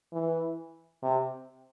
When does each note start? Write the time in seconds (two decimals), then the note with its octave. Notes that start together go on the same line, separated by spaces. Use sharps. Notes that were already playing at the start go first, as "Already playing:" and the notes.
0.13 E3
1.03 C3